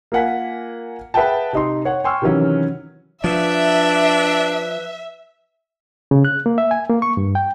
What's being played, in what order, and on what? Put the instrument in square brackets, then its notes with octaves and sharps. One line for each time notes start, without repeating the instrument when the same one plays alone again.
[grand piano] A#3 F4 A#4 F#5 G#5 B6
G#4 B4 E5 F#5 G5 A5
C3 D#4 C6
C#5 F#5
G5 G#5 C6 C#6 E6 F6
C3 D#3 E3 F#3 C#4
[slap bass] F3 [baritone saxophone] D4 [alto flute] B4 [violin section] E5
[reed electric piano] C#3
F#6
A#3
E5
G#5
A#3
C#6
G2
G5